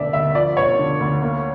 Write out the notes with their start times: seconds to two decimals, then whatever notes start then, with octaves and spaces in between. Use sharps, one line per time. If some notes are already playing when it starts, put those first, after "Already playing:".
Already playing: E1 D3 A3 D5 E5
0.13 D2 E5
0.35 F3 D5
0.57 E1 C#5
0.78 D3
1.00 D2
1.22 A#3